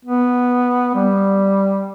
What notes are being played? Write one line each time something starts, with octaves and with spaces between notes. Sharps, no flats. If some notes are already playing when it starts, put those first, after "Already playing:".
B3
G3